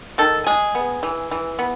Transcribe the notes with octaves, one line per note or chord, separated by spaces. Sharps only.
D#3 A4
G#3 G#4
B3
E3
E3
B3